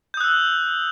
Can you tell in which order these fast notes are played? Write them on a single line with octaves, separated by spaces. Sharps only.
G6 D#6 F#6 E6